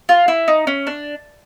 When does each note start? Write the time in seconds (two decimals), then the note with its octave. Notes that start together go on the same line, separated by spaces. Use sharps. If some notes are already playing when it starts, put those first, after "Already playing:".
0.09 F4
0.28 E4
0.48 D#4
0.67 C#4
0.87 D4